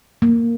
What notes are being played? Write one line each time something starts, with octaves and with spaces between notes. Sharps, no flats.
A#3